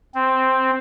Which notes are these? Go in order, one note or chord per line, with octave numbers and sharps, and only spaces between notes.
C4